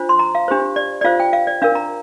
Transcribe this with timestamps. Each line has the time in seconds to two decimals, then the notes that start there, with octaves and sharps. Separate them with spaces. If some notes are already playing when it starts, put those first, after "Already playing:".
Already playing: D4 F4 C5
0.09 C6
0.19 A#5
0.35 F5
0.48 D4 G4 C5
0.76 D5
1.01 D5
1.04 F4 C5 F5
1.20 G5
1.33 F5
1.47 D5
1.62 D4 A#4 F5
1.75 A#5